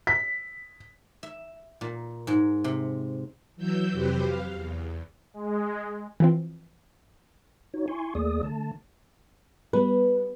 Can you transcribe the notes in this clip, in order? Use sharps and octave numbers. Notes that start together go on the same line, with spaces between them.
B6
E5
A#2
G#2
C3
E3 F#3 E6 G6
F2 C3 F#3 G4 B4 C5
F5
E2
G#3
E3 F3 C4
D#4 F#4 C#5
E4 G#5 C6 C#6
D#2 A3 A#3 G#4 D5 D#6
D3 A3 A5
G3 B3 B4